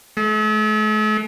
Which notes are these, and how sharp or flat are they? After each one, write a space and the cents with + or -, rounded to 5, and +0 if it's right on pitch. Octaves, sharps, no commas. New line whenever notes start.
A3 -45